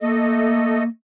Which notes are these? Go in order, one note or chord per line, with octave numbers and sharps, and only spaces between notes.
A3 A#3 A4 D#5